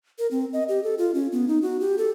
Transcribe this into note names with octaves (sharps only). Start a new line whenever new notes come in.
A#4
C4
D#5
G4
A4
F4
C#4
B3
D#4
F#4
G4
A4